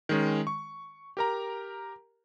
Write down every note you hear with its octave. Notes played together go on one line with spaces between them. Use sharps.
D#3 G#3 C#4
C#6
G4 A#4 A#5